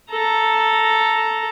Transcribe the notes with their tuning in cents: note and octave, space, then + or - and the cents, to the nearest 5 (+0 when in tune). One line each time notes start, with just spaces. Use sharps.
A4 +0 A#5 +0